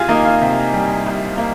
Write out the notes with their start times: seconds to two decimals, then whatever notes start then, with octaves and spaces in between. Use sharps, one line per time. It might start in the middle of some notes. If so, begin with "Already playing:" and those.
Already playing: C2 F4 G#4 F5 G#5
0.08 A#3 D#4 D#5
0.25 F4 F5
0.41 C3
0.73 G3
1.06 C2
1.38 A#3